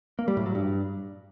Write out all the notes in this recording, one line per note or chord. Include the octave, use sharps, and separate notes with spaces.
A#3
G3
A2
F#3
G2